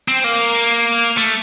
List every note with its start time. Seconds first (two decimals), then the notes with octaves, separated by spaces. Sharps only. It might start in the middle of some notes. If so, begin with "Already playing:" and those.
0.08 C4
0.24 A#3
1.18 A3